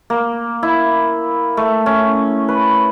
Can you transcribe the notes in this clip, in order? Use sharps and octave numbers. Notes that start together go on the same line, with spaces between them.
A#3
E4
A3
C#4
B4